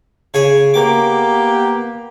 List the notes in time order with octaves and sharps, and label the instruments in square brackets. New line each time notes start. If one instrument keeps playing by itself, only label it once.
[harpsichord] C#3 G#4 C#5
[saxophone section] A#3 B3 G4 [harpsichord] D6